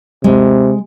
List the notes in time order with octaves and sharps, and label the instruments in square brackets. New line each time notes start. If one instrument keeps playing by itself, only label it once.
[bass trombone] C3 [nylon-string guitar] G#3